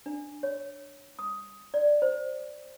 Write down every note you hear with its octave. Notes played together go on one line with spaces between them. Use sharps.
D4
C#5
D#6
D5
C5